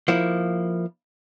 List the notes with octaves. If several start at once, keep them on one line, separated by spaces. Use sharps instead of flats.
F3 A#3 E4